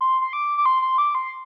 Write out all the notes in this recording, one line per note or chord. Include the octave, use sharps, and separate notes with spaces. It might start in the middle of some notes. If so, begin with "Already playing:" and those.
C6
C6
D6
D6
C6
C6
D6
C6